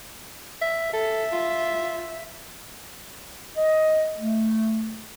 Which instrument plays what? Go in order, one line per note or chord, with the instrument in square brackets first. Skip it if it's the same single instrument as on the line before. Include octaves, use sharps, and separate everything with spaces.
[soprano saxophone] E5
[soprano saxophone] A4 [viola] E5
[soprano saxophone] F4
[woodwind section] D#5
A3